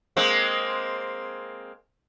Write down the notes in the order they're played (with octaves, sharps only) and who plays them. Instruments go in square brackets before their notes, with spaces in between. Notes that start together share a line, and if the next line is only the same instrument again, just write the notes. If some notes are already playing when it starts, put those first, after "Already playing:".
[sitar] G#3 A#3 C4